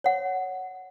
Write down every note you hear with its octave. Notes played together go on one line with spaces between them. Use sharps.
C#5 F#5